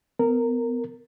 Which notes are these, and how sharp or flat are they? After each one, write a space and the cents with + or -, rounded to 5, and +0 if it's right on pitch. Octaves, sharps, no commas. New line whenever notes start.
B3 +25 A#4 -15